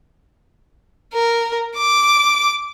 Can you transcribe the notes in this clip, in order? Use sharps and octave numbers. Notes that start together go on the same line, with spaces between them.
A#4
D6